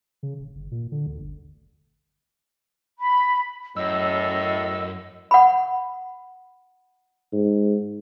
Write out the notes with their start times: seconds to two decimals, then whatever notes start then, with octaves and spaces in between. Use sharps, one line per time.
0.23 C#3
0.39 D#1
0.55 G1
0.71 A#2
0.92 D3
1.06 D2
1.19 G1
2.99 B5
3.76 F#2 A2 D#5 E6
5.31 F#5 B5
7.33 G#2